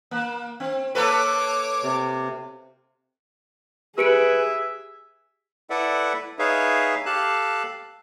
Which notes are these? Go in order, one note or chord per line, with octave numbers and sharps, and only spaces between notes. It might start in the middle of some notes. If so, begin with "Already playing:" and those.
A#3
C4
A#3 A4 B4 C#5 D6
C3
G4 G#4 B4 E5 C#7 D7
E4 A4 B4 D5 E5 F#5
D#4 G#4 B4 C#5 E5 F5
G4 A4 F5 A5 F#6